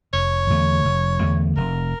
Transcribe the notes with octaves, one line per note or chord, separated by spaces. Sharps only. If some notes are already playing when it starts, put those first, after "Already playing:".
F1 C#5
E2 D3 A3
F1
E2 D3 A3
F1 A#4